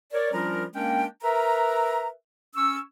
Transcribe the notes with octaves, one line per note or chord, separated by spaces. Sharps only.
A#4 C#5 D5
F3 G3 C#4 D4 F4 A#4
G#3 A#3 C#4 D4 A#4 G5
A#4 B4 E5 A#5
C#4 C#6 E6